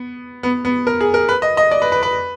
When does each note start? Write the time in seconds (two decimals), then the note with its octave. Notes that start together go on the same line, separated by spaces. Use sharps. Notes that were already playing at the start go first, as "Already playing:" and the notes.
Already playing: B3
0.43 B3
0.65 B3
0.87 A#4
1.01 G#4
1.14 A#4
1.29 B4
1.42 D#5
1.57 D#5
1.71 D5
1.82 B4
1.92 B4
2.03 B4